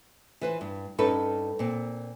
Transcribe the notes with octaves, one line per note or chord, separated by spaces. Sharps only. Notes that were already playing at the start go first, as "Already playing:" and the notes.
E3 B4 C5
G2
G2 C#4 D#4 A4 B4
A#2 C4